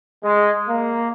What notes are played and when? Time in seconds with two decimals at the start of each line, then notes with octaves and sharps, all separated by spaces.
0.23 G#3
0.68 A#3